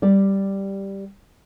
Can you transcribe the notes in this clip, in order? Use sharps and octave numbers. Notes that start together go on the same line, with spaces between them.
G3 G4 D5